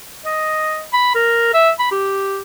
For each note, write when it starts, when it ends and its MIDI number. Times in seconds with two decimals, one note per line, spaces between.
0.26 0.83 75
0.93 1.11 83
1.15 1.54 70
1.54 1.71 76
1.79 1.90 83
1.91 2.41 67